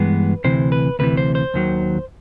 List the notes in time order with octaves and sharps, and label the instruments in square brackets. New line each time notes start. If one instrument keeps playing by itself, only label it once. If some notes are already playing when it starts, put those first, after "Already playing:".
Already playing: [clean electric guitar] G2 E3 G#3 B3 B4
D2 C3 E3 C5
B4
D2 C3 E3 B4
C5
C5
D#2 D#3 F#3